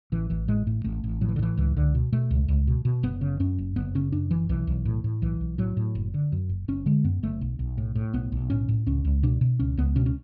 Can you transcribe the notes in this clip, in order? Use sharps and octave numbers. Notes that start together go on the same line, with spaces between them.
A1 E3
A1 E3
A2 G#3
A2 A3
A1 A3
A1
A2 F#3
E3
D3
A2 E3
C#2 E3
C#2 D3
B2
B2 A3
C#2
C#2
B2
B2
F#1 B3
C#3
F#2 C#4
F#1
F#1 B3
C#3 C#4
F#2 D4
F#1 E3
B1 E3
B1
A2
A2
B1 E3
B1
A2 F#3
A2
F#1
D3
F#2
F#1
F#1 C#4
D3 G#3
F#2 B3
F#1 A3
B1
B1
A2
A2
B1 B3
B1
A2 C#4
A2
C#2 C#4
C#2
B2 D4
B2
C#2 C#4
C#2 B3
B2 C#4
C#4